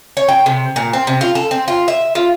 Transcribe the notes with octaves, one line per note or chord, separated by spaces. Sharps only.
C#5
G5
C3
A#2
C4
C3
F4
A4
C4
F4
E5
F4